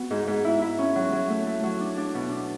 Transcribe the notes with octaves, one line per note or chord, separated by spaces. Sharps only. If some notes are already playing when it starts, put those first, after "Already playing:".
Already playing: B3 F#4
G#2
G#2
E4
E4
C#4
F#3
F#3
A3
A3
F#3
D4
D4
B2
D4